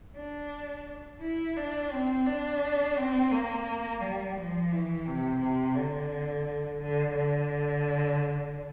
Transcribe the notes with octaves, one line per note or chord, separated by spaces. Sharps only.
D4
E4
D4
C4
D4
C4
A#3
G3
F3
E3
C3
C3
D3
D3
D3